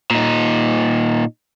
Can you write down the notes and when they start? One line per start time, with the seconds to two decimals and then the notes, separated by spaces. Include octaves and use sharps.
0.11 A#2 D#4